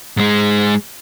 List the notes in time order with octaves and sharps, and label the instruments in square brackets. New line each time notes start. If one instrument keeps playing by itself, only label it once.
[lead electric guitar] G#2 G#3